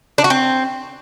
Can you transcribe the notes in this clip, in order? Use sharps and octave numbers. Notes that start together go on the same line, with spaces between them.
D4
F#4
C4